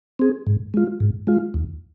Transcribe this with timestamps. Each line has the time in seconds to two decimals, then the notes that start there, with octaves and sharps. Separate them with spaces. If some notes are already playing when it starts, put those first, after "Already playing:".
0.19 C4 G#4
0.47 G#2
0.74 G#3 F4
1.00 G#2
1.27 G#3 F4
1.54 D#2